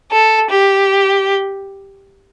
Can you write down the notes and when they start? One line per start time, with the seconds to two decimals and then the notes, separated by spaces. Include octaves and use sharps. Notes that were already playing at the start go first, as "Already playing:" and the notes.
0.12 A4
0.51 G4